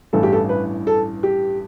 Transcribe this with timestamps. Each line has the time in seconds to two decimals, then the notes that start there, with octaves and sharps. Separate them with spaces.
0.13 A1 G2 E3 A4
0.23 G4
0.33 A4
0.49 B4
0.87 A4
1.23 G4